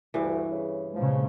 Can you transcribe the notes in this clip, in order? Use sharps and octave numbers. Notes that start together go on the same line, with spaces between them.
D2 G2 E3
C#3
A#2 C#3 F3 G#3